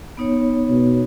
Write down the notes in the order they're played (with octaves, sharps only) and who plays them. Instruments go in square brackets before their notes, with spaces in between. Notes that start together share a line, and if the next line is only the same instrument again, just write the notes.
[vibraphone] B3 D#4 C#5
[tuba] B2